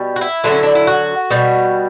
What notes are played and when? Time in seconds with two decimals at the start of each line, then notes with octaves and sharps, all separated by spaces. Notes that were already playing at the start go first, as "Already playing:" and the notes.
Already playing: B2 G3
0.16 F#4
0.21 E4
0.44 D3 F#3 A3
0.51 C#4
0.63 D4
0.75 E4
0.87 F#4
1.30 B2 G3